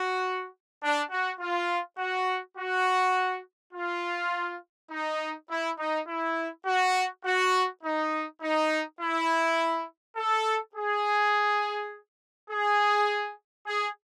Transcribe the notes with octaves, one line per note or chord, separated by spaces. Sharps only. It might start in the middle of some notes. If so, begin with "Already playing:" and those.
Already playing: F#4
D4
F#4
F4
F#4
F#4
F4
D#4
E4
D#4
E4
F#4
F#4
D#4
D#4
E4
A4
G#4
G#4
G#4